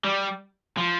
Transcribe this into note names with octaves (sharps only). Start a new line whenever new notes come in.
G3
F3